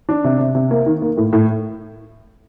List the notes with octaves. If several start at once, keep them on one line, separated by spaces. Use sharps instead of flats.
D4
C3
C3
C3
A#3
D#3
A#3
A2
A2